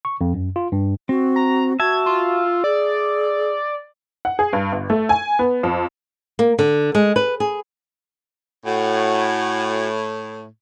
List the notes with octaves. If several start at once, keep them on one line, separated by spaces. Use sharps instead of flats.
C#6
F2
F#2
F4
G2
C4 F#4
A#5
F#4 E5 A5 G#6
F4
G#4 D5
F#5
G#4
G2
G1
A3
G#5
B3
F2
A#3
D3
G#3
B4
G#4
A2 F#4 F#5 G#5